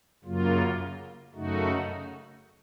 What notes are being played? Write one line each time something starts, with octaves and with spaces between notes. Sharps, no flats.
F#2 C#3 F#3 A#3 F4
F#2 C#3 A3 D#4 F#4